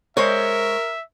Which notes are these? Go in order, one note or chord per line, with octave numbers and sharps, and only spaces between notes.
G#3 A#4 C5 C#5 E5